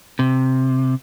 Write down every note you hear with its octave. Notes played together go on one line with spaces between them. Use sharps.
C3